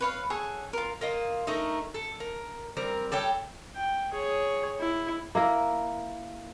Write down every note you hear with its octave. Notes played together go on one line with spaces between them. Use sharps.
B4 C#5 F5
G#4 A4 C#5 F#5
F4 A#4
A#3 F4 D#5
A3 D#4 A#4
A4
A#4
G3 C4 A#4
G3 A4 C#5 G5
G5
G#4 C#5
E4
A#3 E4 A#4